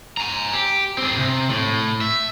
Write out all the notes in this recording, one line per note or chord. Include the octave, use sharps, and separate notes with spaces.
G#5 A#5
G4
C4 G#4
C3
A2
E5